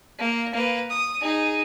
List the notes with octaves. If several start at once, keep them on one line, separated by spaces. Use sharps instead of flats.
A#3
A#3 B4
D#6
D#4 G#4